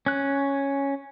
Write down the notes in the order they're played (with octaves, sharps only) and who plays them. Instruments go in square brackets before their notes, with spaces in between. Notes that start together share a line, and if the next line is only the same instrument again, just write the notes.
[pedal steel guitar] C#4 F#6